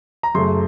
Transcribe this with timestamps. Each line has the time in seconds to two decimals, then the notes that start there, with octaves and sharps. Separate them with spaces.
0.23 A#5
0.34 F#2 C#3 A3 C6